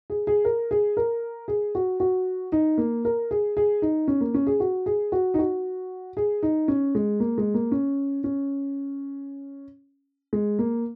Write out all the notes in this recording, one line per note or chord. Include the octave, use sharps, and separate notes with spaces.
G#4
G#4
A#4
G#4
A#4
G#4
F#4
F#4
D#4
A#3
A#4
G#4
G#4
D#4
C#4
A#3
C#4
G#4
F#4
G#4
F#4
D#4
F#4
G#4
D#4
C#4
G#3
A#3
G#3
A#3
C#4
C#4
G#3
A#3